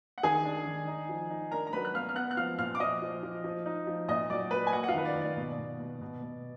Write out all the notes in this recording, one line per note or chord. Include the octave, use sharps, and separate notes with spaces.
F#5
D#3 G#4 G#5
D4
D#3
D#4
F3
D#4
D4 A#4 A#5
A#5
F#3 B4 B5
F#6
B3 F5 F6
F6
B3 F#5 F#6
F#6
F3 F5 F6
A#2 F5 F6
D6
F3 D#5 D#6
F3
F3
F3
D#4
F3
A#2 D#5 D#6
F#3 D5 D6
F#3 B4 B5
G#5
A#3 F#4 F#5
F#5
F4 F5
D#3 B4
D5
D#3
D5
B2
B2
B2
B2
B2